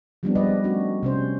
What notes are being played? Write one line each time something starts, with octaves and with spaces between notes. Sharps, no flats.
F3 G3 G#3 B3 C4 D4
G3 B4 D5 D#5
A3 C#4 D4 F#4
C3 C#4 C5